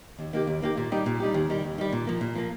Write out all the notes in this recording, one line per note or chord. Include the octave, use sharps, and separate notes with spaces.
D#2
D#3 A#3 G4
D#2
D#3 A#3 G4
A#2
G3 D#4 G4
A#2
G3 D#4 G4
D#2
D#3 G3
D#2
D#3 G3
A#2
F3 A#3
A#2
F3 A#3